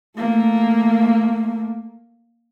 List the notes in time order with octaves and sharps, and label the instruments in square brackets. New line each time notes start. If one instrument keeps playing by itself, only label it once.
[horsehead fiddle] A3 A#3